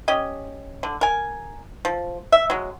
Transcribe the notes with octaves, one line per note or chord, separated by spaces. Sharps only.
C#4 G4 D#5
D3
A#4 G#5
F3
E5
F#3 G#3